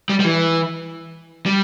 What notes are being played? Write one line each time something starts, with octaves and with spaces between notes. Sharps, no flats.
G3
G3
E3
G3